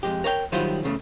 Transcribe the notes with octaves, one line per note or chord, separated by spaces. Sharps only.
F2 G#3 G4
A#4 C#5 D5 G5
D#3 F#3 G3 E4 F4 C5
E2 C#3 A3